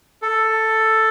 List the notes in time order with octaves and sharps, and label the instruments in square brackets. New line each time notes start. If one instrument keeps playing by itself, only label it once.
[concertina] A4